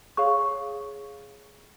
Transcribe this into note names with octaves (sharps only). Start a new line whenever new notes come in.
G#4 C#5 F5 C#6